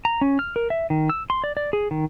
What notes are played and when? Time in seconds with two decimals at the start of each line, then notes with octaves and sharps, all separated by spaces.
0.05 A#5
0.21 C#4
0.39 F6
0.56 A#4
0.70 E5
0.90 D#3
1.10 E6
1.30 C6
1.44 D5
1.57 D5
1.73 G#4
1.91 D#3